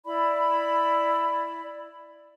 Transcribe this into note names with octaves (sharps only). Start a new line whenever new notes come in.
E4 D5 B5